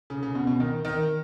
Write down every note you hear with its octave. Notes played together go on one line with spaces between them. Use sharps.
C#3
C#3
B2
B2
D#3
D#3